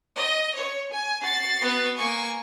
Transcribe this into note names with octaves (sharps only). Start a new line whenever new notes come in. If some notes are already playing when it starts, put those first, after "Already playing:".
D#5
C#5 C#6
G#5
F#4 A6 C7
B3 B4
A#3 G#5 C#6